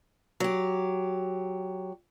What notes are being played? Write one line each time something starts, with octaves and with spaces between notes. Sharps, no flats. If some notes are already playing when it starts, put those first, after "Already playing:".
F#3 G4